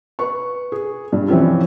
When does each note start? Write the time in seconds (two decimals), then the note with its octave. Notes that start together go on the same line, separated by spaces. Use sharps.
0.19 B4 C#6
0.72 G#4
1.12 G2
1.28 E3 F3 C4 C#4 F4